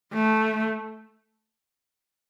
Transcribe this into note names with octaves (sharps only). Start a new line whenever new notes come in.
A3